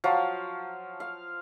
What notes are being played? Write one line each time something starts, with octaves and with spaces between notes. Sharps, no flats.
F3 F#3 F5
F5